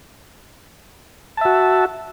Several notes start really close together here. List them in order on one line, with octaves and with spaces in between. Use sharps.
A5 E5 F#4